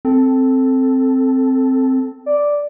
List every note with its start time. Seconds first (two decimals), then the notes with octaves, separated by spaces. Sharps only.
0.05 C4 A4
2.26 D5